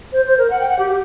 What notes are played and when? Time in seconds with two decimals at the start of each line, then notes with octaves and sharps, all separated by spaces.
0.12 C5
0.26 C5
0.38 A#4
0.50 F#5
0.60 G5
0.69 F#5
0.79 G4
0.89 G4